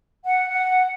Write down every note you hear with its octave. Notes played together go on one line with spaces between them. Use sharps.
F#5
F#5